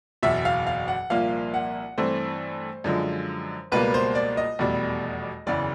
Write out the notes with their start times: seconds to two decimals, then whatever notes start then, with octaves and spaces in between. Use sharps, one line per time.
0.23 F#1 E2 B2 E5
0.45 F5
0.67 F5
0.88 F#5
1.10 C2 A#2 F3 A#3 F5
1.54 F#5
1.98 G2 E3 A3 C4 C5
2.84 F#2 D3 F3 G#3
3.72 C#2 B2 G3 A#3 B4
3.94 C5
4.15 D5
4.37 D#5
4.59 F1 E2 B2 G3
5.46 F#1 E2 C#3 E3 D5